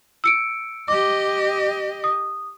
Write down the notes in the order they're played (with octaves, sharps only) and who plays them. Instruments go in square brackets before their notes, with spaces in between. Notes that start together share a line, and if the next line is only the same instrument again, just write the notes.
[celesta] E6 C#7 D7
[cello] G4 D#5 [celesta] D6
[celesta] D#6